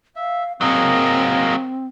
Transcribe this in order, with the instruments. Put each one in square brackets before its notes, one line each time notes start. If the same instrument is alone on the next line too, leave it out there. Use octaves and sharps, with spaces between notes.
[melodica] E5 [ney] F5
[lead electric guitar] F#3 A#3 [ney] C4 [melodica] G#4 A#4 D#5